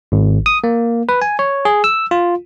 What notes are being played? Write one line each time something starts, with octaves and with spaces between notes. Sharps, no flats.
G#1
D#6
A#3
B4
G#5
C#5
G#4
E6
F4